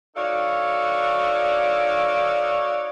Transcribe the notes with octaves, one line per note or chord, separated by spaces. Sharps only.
D#4 F#4 A4 C#5 D5 F5